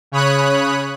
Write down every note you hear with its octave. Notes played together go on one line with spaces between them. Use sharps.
C#3 C#5 B5 D#6 F#6